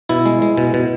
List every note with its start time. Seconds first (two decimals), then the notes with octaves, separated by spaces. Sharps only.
0.09 B2 E4
0.25 G#3
0.42 G#3
0.57 B2
0.74 B2